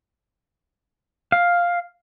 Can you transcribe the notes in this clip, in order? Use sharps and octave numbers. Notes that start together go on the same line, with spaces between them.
F5